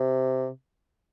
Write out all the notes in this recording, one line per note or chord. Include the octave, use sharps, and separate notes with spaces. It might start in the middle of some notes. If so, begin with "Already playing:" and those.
Already playing: C3